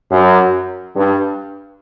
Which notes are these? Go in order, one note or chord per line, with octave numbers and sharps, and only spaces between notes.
F#2
G2